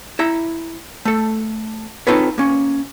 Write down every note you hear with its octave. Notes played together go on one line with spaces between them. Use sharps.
E4 E5 A#5
A3 A4
C4 D#4 F4 A4 B4 C#5
A#3 C#4